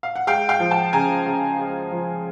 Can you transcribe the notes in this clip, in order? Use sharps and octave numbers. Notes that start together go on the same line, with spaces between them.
F5
F#5
G#3 F5 G5
F5 G5
F3
G5 A5
C#3 G#5 A#5
C#3
G#3
F3